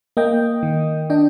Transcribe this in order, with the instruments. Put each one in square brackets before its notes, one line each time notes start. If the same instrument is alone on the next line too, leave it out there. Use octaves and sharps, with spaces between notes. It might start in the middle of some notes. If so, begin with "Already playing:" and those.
[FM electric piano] A#3 D#5 G5
D#3
D4 D#5 G5